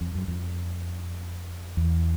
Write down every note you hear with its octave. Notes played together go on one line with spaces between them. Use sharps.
F2
F#2
F2
E2